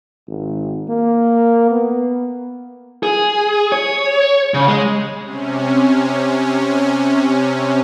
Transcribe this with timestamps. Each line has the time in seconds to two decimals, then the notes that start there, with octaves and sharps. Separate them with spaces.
0.28 G#1
0.90 A#3
1.71 B3
3.03 G#4
3.72 C#5
4.54 C#3
4.68 G#3
5.20 C3 C#4